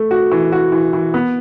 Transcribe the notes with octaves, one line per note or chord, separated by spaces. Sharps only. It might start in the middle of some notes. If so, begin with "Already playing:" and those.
Already playing: A3
F#4
E3
F#4
E3
E3
B3